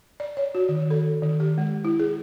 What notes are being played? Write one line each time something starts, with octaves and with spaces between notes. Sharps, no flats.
D5
C#5
F#4
D#3
A4
D#3
G4
G#3
E4
G#4